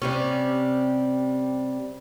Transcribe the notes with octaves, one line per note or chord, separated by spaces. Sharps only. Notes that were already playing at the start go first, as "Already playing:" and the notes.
C3 G3 C#4